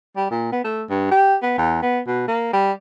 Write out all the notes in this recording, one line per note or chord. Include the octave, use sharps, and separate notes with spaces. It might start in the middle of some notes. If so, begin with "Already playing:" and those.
G3
A#2
B3
A3
G2
G4
B3
E2
B3
B2
A#3
G3